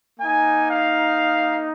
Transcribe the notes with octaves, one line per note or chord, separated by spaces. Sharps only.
A#3 D#4 G#5
F5